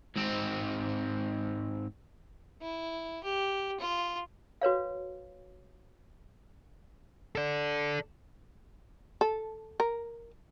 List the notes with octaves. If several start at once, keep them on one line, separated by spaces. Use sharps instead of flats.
G#2 C4
E4
G4
F4
F#4 B4 C#5 F5
A4 D5
A4
A#4